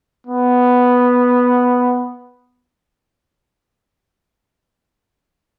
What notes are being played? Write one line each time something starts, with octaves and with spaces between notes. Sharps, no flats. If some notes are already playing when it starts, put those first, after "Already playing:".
B3